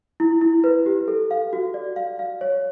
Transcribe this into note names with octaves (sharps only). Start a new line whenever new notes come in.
E4
E4
B4
G4
A4
F5
F#4
D5
F5
F5
C#5